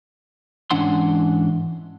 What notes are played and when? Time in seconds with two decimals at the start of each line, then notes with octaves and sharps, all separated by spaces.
0.71 G#2 E3 C#4 D4 F#5 C6